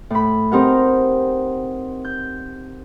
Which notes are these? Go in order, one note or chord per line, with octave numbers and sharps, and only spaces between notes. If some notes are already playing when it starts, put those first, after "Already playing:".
A2 B5
C4 D#4 G4 A#4 F#5
G6